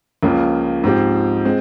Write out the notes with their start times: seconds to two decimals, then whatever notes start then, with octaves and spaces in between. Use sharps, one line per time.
0.23 C#2 C#3 F3 A#3
0.84 G#2 F3 C4 G4
1.45 G#3 C4